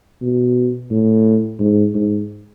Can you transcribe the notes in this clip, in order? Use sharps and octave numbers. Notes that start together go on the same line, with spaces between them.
B2
A2
G#2
G#2